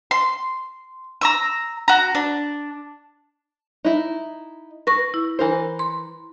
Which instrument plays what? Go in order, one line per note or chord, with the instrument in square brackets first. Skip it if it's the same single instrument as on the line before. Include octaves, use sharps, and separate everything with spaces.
[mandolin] C6
A#5 C#6 E6
F#4 A#5
D4
[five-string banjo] D#4 E4
[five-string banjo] B4 [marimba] C#6 A#6
[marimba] E4
[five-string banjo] E3 A#4 C5
[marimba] C6